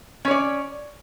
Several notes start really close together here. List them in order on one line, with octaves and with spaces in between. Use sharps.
C#4 C#5 D5